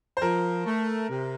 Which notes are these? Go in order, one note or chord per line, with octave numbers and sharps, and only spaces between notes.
C5
F3 A#4
A3
C3